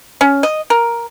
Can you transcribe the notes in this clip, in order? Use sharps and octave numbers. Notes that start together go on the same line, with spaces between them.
C#4
D#5
A#4